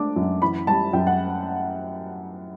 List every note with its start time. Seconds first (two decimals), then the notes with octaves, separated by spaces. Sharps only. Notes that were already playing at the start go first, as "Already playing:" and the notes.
Already playing: A3 D4 D6
0.16 F#2
0.42 E3 B5
0.67 G3 A5
0.93 F#2 G5
1.07 F#5